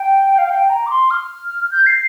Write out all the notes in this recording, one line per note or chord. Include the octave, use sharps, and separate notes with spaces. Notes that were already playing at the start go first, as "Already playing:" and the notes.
Already playing: G5
F5
G5
A#5
D6
C6
F6
G6
C7